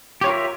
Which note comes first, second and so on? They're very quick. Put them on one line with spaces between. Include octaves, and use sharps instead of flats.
G4 C#5 F4 A#4 E5